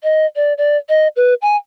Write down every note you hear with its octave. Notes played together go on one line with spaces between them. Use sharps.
D#5
D5
D5
D#5
B4
G#5